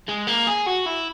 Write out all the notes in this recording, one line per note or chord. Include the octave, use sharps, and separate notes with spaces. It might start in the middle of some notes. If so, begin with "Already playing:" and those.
G#3
A#3
G#4
F#4
E4